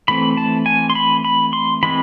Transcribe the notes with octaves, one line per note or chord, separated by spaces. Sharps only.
E3 A3 C4 B5
A5
G#5
C6
B5
B5
C6
E3 G#3 C4 B5